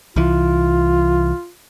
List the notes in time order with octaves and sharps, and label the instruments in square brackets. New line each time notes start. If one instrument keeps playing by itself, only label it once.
[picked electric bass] C2 E3 [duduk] F4